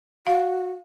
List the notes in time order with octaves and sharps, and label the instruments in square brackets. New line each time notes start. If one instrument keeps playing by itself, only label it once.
[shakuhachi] F#4 [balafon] F5